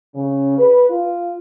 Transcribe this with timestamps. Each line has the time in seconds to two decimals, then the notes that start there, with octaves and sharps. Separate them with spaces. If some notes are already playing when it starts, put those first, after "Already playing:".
0.14 C#3
0.58 B4
0.89 F4